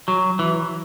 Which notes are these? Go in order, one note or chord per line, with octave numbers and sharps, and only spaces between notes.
F#3
E3